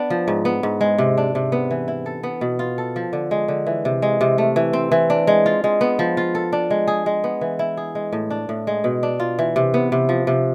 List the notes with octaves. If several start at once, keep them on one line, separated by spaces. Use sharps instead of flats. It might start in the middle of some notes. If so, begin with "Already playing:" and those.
Already playing: B3 D4
F3
G#2
B3
G#2
G#3
C3
D4
C3
B3
E3
E4
A4
B3
B2
F4
A4
F3
D3
G#3
D3
E3
C3
G#3
C3
A3
E3
C4
E3
D4
G#3
F4
G#3
B3
F3
F4
A4
D4
G#3
G#4
G#3
B3
E3
E4
G#4
G#3
A2
D4
A2
G#3
B2
D4
F4
E3
C3
B3
C3
F3
C3